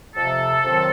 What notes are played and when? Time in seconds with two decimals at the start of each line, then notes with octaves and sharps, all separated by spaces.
0.15 F2 C3 F3 A4
0.64 F2 C3 D#3 F#3 C4